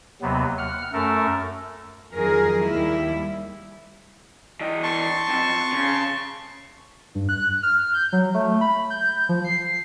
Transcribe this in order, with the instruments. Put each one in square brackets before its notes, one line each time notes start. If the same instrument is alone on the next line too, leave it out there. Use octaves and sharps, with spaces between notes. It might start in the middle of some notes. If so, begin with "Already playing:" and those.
[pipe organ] D#2 C3 F#3 B3
F#5 F6
F#2 A3 A4 A#4
[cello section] F2 D#3 F#3 G#4 A#4
D#2 G3 E4
[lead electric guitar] E3 D#5
[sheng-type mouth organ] A5 C6 C#6
[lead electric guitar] F2
C#3
[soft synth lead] G2
F#6
F6
G6
F#3
A3
B5
G6
F3
C7